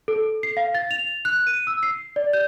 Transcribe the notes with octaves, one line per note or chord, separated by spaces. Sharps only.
A4
C7
F5
A6
F7
F#6
D#7
E6
C7
D5
G6